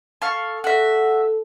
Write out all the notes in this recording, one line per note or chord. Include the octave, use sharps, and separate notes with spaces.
A4 F5 C#6
F#4 A4 E5